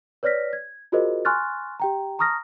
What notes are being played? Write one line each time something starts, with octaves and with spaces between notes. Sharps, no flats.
B4 C#5 D5 F6 A#6 B6
G#6
F4 F#4 G#4 A#4 C5 D#5
G#5 C6 C#6 F6 F#6 A6
G4 G5 A#5
A5 A#5 C#6 D#6 F6 A#6